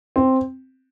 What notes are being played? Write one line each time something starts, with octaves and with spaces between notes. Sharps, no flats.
C4